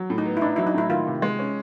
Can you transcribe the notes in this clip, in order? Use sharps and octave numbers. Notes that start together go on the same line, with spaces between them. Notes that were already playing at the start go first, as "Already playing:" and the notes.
Already playing: F#3
A2
D#4
B3
E4
D4 D#4
F#3 E4
D#4
A2 E4
D#3 F4
C3
G#3
C#4